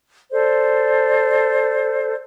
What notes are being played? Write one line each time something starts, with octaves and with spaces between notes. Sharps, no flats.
A4 C5 D5